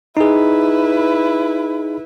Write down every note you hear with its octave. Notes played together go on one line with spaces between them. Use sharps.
D#4 E4 G#4 B4